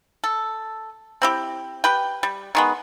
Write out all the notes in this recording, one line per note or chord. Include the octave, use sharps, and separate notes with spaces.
A4
C4 E4 G4
G4 B4 G5
G3
D#3 G#3 B3